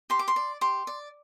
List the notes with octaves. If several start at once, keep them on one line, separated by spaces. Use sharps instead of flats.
G4 C6
D6
C6
D5
G4 C6
D5